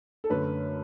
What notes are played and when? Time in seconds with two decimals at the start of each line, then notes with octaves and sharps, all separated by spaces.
0.24 A4
0.30 F#2 D3 A3 B4